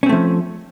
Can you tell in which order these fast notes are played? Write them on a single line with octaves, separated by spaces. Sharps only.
C#4 C4 A3 F3